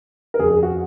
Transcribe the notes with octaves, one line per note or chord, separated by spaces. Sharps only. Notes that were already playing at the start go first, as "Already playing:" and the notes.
A#4
F2 C#3 G#4
G#4
F#4